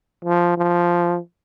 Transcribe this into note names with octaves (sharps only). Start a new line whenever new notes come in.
F3
F3